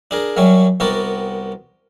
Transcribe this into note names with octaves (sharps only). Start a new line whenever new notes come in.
D4 G#4 A#4
F#2 F#3 G3 C#4
C2 B3 F#4 G4 A#4 A5